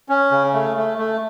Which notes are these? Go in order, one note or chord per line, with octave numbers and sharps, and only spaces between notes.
C#4
C#3
A3
A3
A3